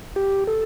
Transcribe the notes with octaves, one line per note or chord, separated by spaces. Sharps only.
G4
A4